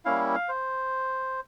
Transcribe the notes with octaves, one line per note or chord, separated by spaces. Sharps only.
G3 A#3 C#4 E4 F5
F5
C5